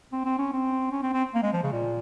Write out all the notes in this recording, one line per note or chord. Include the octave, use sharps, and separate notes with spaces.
C4
C4
C#4
C4
C#4
C4
C4
A#3
G#3
F3
C#3
A#2